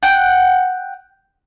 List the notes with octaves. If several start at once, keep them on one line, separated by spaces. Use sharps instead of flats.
F#5 G5